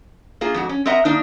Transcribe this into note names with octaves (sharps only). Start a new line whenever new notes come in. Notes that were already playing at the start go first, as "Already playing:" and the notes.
A#3 F4 G#4
F2 G#2 F#4
C#4
C4 A#4 D#5 E5 F#5 A#5
D#3 A#3 D4 D#4